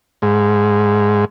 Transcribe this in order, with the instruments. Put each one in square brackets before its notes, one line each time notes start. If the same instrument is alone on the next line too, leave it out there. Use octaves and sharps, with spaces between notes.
[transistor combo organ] G#2